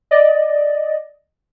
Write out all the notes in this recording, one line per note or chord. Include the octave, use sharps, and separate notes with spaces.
D5 D#5